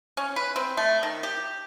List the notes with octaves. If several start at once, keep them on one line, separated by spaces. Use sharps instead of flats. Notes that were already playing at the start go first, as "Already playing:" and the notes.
C#4
B4
C4
A3
D#3
G4